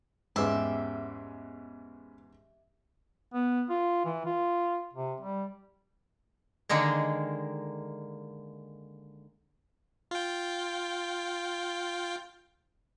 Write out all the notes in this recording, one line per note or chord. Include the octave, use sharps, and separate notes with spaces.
E2 G#2 B3 C#4 G4 E5
B3
F4
E3
F4
C3
G3
D3 D#3 G#3 A#3
F4 G5